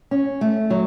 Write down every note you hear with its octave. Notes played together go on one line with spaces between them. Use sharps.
C#4
A3
F#3